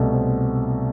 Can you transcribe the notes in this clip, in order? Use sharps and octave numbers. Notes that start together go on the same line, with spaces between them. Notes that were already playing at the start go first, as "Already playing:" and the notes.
Already playing: C2 B2 A3
C4